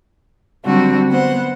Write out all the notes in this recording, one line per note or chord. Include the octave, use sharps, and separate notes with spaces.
D3 F#3 G3 C4 D4 F#4
B3 C5 F#5